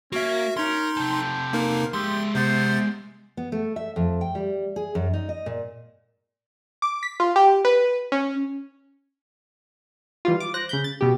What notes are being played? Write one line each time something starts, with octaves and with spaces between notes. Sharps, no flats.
A#3 C#4 F#4 E5
C#4 D#4 A#4 C6
C3 A4 G5
A#3 D#4 A#4
G#3 G4 E5 C6
C3 B3 C5 A6
B3
A3
E5
F2
G5
G3
G#4
F#2
D#4
D#5
A#2
D6
B6
F4
G4
B4
C#4
E3 G3 F4
D6
C5 F#6 A#6
C#3 B5 G6
A6
B2 G4